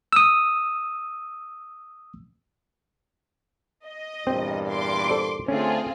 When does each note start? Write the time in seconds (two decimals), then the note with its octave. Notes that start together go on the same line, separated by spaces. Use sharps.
0.13 D#6 E6
3.87 D#5
4.27 E2 G2 A#2 C4
4.69 C6 D6
5.09 A4 C5 D5
5.48 D3 A3 C4 C#4 F4 G#4